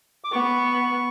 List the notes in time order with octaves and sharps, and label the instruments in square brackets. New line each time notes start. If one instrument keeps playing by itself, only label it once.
[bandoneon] D6
[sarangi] B3 [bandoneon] C#6